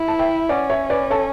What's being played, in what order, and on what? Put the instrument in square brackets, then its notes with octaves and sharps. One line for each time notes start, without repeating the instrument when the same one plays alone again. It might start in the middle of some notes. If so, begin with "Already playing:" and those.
Already playing: [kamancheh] E4
[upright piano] A5
E5 G5
[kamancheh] C#4 [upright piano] D5 F#5
[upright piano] C#5 E5
B4 D5
A4 C#5